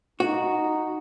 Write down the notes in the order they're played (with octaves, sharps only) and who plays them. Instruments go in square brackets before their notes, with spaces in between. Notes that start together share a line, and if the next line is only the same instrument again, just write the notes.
[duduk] D#4 [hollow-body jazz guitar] F#4